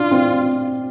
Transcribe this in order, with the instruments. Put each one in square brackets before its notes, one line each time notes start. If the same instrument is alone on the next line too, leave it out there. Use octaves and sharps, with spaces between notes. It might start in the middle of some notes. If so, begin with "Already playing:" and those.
Already playing: [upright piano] D4 [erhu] F4
[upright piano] C4